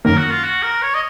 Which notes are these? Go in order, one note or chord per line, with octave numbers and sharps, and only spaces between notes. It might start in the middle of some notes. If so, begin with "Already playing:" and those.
F#2 D#3 A#3 A#4
F#4
F4
F#4
A#4
C#5
D#5